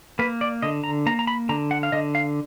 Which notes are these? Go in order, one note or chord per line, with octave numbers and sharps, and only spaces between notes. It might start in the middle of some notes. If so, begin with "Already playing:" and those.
A#3 B4
D5
D3 D#5
A#5
A#3 A#5
A#5
B5
D3 A#5
F#5
F5
D3 D#5
F5